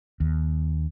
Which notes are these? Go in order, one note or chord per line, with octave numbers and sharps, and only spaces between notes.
D#2